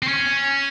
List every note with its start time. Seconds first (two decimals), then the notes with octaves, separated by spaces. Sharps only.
0.02 C4
0.08 C#4